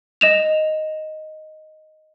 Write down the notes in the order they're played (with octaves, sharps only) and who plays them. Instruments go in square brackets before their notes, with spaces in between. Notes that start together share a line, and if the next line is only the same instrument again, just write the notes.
[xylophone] D#5 E7 F7